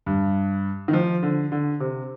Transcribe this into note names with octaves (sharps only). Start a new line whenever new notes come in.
G2
D#3
F3
D3
D3
C3